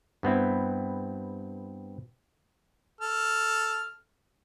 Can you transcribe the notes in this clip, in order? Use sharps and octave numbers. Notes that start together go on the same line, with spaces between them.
G2 B3 C4 E4
A4 F6